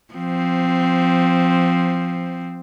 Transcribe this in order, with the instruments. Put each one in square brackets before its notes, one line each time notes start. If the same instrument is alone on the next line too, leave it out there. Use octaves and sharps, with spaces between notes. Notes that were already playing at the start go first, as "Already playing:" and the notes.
[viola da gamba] F3 C4